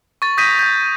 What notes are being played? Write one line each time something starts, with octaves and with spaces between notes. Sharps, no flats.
C#6 A6
D#6 G6 A#6 B6 D#7
G6